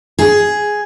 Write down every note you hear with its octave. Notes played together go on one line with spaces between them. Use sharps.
G#4